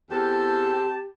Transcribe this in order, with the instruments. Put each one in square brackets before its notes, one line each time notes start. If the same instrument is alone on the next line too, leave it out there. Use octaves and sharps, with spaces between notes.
[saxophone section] E2 A4 [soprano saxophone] C4 [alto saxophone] G4 [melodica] A5